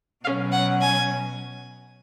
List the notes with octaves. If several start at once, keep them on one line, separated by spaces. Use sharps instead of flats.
B2 F#3 C#4 F5
F#5
G#5